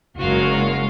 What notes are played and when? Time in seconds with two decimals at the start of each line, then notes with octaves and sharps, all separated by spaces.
0.19 F#1 G#3 F4 F#4 A#4 C#5 F5